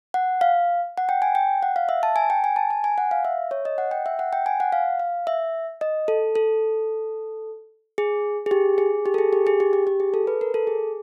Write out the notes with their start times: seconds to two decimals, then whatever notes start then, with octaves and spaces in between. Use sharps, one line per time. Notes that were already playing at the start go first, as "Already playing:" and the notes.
0.14 F#5
0.41 F5
0.98 F#5
1.09 G5
1.22 G#5
1.35 G5
1.63 F#5
1.76 F5
1.89 E5
2.03 A5
2.16 G#5
2.30 G5
2.44 G#5
2.56 A5
2.70 G#5
2.84 G#5
2.98 F#5
3.11 F5
3.25 E5
3.51 C#5
3.65 D#5
3.78 F#5
3.91 G5
4.06 E5
4.19 F#5
4.33 G5
4.46 G#5
4.60 F#5
4.72 F5
4.99 F5
5.27 E5
5.81 D#5
6.08 A4
6.35 A4
7.98 G#4
8.46 G#4
8.51 G4
8.78 G#4
9.06 G4
9.14 A4
9.18 G#4
9.33 G4
9.47 G#4
9.60 G4
9.73 G4
9.87 G4
10.00 G#4
10.14 A4
10.27 B4
10.41 A#4
10.54 A4
10.67 G#4